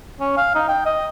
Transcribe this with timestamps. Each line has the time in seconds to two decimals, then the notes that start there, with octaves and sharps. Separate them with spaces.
0.20 C#4
0.37 F5
0.55 D#4
0.69 G5
0.86 D#5